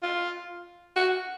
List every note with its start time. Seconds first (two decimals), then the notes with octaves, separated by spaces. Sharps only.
0.03 F4
0.96 F#4